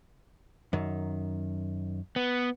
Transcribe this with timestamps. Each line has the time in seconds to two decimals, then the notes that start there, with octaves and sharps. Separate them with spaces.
0.73 F#2 D#3
2.16 B3